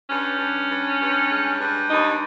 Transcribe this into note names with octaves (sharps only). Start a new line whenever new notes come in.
G2 C#4
G2
G2
G2
G#3
G2
D#2 D#4